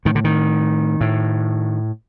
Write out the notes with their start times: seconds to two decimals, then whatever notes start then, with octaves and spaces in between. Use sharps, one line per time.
0.05 A2 D#3
0.15 D3
0.24 D#3
1.01 A2